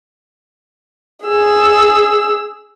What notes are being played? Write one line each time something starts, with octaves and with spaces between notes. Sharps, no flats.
G#4 E6